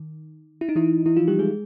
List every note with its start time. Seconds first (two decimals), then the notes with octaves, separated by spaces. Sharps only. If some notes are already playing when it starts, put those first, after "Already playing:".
Already playing: D#3
0.61 E4
0.69 D#4
0.76 E3 E4
1.06 E3 E4
1.17 F3 F4
1.28 G3 G4
1.39 G#3 G#4